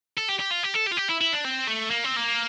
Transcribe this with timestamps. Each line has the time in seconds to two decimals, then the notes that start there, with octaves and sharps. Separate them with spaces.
0.18 A4
0.29 G4
0.40 G4
0.51 F4
0.64 G4
0.75 A4
0.87 G4
0.92 F4
0.98 G4
1.10 E4
1.21 E4
1.33 D4
1.44 C4
1.67 A3
1.90 A#3
2.04 C4
2.17 A#3